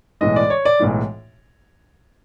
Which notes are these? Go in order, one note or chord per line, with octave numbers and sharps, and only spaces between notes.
B1 A2 E3 G#3 D#5
D5
C#5
D5
B1 A2 E3 G#3